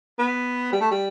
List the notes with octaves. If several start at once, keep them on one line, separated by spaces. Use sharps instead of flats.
B3
G3
A3
G3